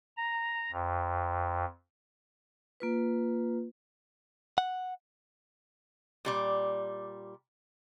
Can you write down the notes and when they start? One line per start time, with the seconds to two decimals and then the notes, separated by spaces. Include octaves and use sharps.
0.17 A#5
0.72 F2
2.80 A#3 F4 B4
4.58 F#5
6.25 A#2 G3 D5